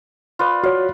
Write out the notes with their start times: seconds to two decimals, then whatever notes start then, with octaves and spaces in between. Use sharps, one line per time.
0.39 F4 B4 D5
0.63 F#4 C#5 F5